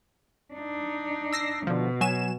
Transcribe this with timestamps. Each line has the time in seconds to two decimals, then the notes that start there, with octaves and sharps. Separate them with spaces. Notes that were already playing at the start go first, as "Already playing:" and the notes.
0.54 D4 D#4
1.33 E6 A#6 C7
1.67 B2 D3 F3
2.01 F#3 G#5 E7